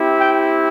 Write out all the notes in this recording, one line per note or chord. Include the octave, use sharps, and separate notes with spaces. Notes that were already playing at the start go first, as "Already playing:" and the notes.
Already playing: C4 E4 G4
G5